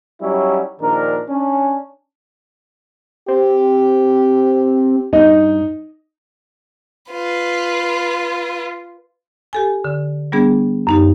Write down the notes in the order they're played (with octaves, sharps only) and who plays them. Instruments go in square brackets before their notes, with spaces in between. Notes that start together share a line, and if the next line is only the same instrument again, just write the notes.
[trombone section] F#3 G3 C#4 D#4 E4
A#1 D#3 D4 A#4
C#4 D4
[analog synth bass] C4 [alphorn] G4
[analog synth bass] G2 [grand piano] D#4 D#5
[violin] F4 B4
[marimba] G4 A4 G#5
D3
G3 B3 D4 G#4
F#2 D#4 G4